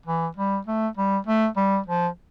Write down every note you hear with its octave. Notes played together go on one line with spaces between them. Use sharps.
E3
G3
A3
G3
A3
G3
F3